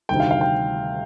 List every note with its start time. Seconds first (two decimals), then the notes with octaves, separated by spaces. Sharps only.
0.09 D2 C3 D#3 G3 G5
0.20 F5
0.31 F5
0.41 G5